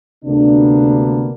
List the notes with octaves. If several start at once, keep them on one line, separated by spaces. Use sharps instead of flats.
D2 C3 A#3 B3 D4